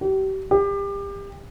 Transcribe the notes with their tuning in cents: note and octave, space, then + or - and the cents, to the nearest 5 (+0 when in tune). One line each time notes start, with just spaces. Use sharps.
G4 -35
G4 +30